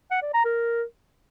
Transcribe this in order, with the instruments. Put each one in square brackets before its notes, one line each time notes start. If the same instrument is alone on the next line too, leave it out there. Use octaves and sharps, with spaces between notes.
[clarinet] F#5
D5
A#5
A#4